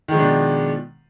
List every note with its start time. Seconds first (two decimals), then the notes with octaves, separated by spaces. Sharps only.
0.08 D#3
0.12 G#3
0.15 F3
0.18 D4
0.21 B2